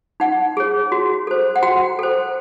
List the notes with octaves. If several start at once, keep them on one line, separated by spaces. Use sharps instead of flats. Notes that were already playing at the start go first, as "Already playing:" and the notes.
D#4 F#5
G#4 C#5
F#4
A4 C5
F#5
F#4 G5
A4 C5